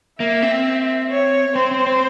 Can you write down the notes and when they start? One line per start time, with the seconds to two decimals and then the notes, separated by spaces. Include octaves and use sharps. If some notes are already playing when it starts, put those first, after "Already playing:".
0.20 A#3 E5
0.42 C4
1.11 C#5
1.55 C4 C5
1.71 C4
1.87 C4